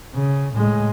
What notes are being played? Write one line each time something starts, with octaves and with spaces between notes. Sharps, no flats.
C#3
A2 G#3